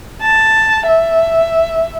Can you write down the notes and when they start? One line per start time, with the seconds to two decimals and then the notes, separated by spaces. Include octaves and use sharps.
0.22 A5
0.87 E5